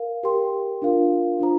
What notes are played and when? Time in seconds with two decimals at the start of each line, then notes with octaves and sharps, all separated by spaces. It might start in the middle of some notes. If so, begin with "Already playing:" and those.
Already playing: A#4 F5
0.23 G4 A#4 G5 C6
0.82 D4 F4 A#4 F5
1.40 D4 F4 C5 A#5